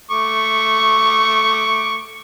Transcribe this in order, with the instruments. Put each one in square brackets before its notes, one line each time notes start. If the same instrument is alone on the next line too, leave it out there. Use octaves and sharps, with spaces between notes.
[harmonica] A3 C#6 D6